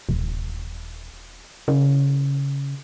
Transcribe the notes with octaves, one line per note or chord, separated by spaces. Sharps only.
D#1
C#3